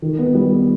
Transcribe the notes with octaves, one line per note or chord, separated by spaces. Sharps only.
D#3
B3
G3
B3